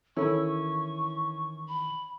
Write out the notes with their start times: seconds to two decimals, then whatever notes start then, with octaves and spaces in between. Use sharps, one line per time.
0.17 D#3 E3 C#4 E4 A4 B5 C#6
1.69 B5